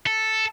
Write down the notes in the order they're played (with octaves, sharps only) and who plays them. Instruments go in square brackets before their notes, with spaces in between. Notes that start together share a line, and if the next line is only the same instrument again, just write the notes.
[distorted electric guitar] A4